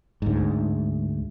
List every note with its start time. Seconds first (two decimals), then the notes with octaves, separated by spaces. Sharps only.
0.22 D2 G#2